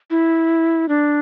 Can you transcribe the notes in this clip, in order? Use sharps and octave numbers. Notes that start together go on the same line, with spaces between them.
E4
D4